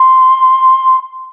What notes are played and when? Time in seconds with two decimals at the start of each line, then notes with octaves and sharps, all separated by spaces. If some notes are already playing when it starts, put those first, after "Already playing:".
Already playing: C6